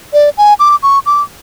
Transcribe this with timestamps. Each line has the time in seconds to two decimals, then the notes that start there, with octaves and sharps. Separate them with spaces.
0.13 D5
0.38 G#5
0.59 D6
0.83 C#6
1.06 D6